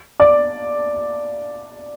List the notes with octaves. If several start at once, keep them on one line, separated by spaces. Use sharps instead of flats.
D5 D6